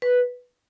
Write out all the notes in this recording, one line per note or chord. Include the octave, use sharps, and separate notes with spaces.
B4